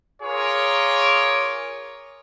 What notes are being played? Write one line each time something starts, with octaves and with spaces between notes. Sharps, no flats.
F4 G#4 A#4 C#5 D6